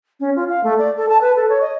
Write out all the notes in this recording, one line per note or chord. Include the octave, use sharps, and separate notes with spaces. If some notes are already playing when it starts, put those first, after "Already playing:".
C#4
F4
F5
A3
D5
A4
A5
B4
A4
C#5
D#5